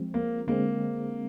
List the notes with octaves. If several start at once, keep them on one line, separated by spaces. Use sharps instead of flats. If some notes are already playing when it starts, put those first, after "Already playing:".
Already playing: F3 G#3 C4
A#3
D3 G#3 A#3 C4